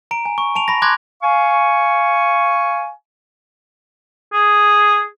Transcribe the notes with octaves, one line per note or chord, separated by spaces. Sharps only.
A#5 D7
G#5
C#6
A5 D7 F7
B5 A#6
B5 C6 D6 F#6 G#6 A#6
F5 G#5 C#6
G#4